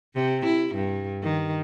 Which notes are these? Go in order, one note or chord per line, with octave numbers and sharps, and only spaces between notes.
C3
E4
G2
D#3